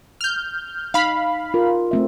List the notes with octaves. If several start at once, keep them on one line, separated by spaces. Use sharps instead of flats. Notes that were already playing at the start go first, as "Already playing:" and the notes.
F6 G6
D#4 F5 B5
F4 A#4
A3 C4 E5